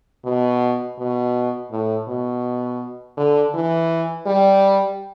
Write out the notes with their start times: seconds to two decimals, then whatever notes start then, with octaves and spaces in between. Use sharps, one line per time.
0.25 B2
0.98 B2
1.71 A2
2.08 B2
3.17 D3
3.54 E3
4.26 G3